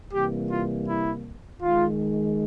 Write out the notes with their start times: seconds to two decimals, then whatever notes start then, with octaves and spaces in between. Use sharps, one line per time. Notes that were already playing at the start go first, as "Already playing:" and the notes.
0.13 C3 E3 G3 A#3 G4
0.51 F4
0.88 E4
1.63 D#3 G#3 F4